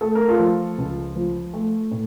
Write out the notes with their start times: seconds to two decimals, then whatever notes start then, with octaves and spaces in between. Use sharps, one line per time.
0.01 A3 A4
0.15 A#4
0.28 F4 A4
0.39 F3
0.78 C#2
1.16 F3
1.53 A3
1.91 A2